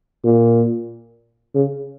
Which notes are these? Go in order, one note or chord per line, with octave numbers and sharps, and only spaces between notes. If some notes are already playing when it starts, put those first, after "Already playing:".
A#2
C#3